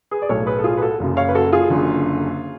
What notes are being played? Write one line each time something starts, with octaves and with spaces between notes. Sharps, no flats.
G#4 B4
D5
B1 A2 A4 C#5
G#4 B4
A4
F4 G#4
B4
F#4 A4
F#1 F#2 C#3
C#5 F5
B4
F#4 A4
F4 G#4
F#1 F#2 D3